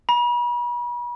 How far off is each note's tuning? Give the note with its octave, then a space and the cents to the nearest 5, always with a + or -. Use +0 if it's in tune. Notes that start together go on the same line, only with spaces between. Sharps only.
B5 -40